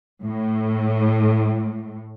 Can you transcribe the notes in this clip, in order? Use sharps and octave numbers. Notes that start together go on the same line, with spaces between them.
A2